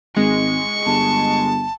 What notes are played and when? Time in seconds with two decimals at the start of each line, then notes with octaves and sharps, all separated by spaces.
0.17 G#1 G#3 C#6
0.86 G1 A5